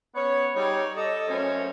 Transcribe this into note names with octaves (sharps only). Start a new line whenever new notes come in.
B3 C#4 C#5
G3 D#4 G#4 C#5
A4 D5 D#5
F#2 A3 C#4 C5 C#5